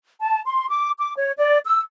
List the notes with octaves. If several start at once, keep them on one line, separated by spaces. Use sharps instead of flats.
A5
C6
D6
D6
C#5
D5
E6